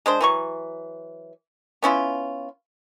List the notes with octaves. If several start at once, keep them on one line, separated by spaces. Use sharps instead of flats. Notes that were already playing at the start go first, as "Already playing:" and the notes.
G#3 D4 C5
E3 F#3 C#6
B3 C#4 E4 F4